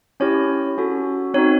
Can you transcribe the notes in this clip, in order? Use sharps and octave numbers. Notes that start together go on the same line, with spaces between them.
C#4 E4 G4 C#5
C#4 F#4 A4
C4 D#4 F#4 C#5